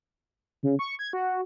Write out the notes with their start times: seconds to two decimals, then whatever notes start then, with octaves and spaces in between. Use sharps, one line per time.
0.63 C#3
0.79 C#6
0.99 G#6
1.13 F#4